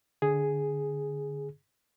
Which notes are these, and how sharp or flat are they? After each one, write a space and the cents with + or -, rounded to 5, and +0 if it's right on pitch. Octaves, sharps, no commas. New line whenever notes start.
D3 +0 G#4 +0